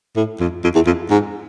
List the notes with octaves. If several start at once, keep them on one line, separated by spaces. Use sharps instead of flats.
A2
F2
F2
E2
F2
G#2